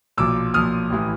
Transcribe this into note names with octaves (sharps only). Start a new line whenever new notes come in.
B1 A#2 F3 D6 E6
B1 A#2 F3 D#6 F6
A1 A2 E3